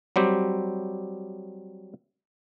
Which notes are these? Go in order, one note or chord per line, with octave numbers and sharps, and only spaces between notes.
F#3 G3 C4 G4